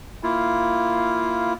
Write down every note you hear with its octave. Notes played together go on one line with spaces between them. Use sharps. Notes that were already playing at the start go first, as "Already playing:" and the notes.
A#3 E4 F4